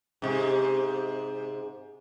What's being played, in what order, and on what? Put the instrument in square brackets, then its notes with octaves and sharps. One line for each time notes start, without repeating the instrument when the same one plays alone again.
[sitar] G#2 C3